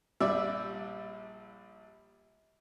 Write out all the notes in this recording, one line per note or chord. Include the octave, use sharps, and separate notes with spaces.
A#1 G3 D5 E5